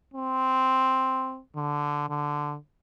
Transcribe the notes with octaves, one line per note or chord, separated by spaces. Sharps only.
C4
D3
D3